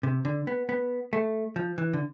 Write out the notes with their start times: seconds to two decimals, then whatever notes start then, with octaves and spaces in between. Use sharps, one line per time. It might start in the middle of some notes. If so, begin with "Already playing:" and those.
0.03 C3
0.25 D3
0.47 B3
0.69 B3
1.13 A3
1.56 F3
1.78 E3
1.93 D3